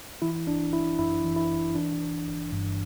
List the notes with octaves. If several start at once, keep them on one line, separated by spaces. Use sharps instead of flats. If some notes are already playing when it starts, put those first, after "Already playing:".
E3 E4
G1 D4
G1 E4
F#2 E4
E3
E4
G1
E3 D4
G1
G1
G2